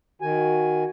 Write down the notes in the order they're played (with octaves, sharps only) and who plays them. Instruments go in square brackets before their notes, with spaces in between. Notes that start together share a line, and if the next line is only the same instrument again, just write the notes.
[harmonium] D#3 G#5 [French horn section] F#4